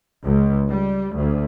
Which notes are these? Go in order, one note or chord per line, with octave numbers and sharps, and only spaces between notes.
C#2
G3
D2